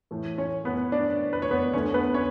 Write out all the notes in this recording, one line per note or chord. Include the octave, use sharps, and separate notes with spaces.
A2 E3 A3
C#4 C#5
B3 B4
D4 D5
B4
C#5
B3 B4
D2 D3 A3 C#4 C#5
B3 B4
C#4 C#5